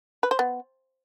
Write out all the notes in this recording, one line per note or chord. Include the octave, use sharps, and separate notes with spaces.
B4
C5
B3